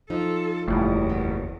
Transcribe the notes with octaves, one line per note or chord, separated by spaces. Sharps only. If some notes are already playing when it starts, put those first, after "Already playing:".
F3 D#4 A4
F#1 E2 A2 G3
B3